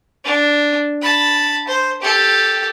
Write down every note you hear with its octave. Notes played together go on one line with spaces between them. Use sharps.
D4
A5 B5
C5
G4 A4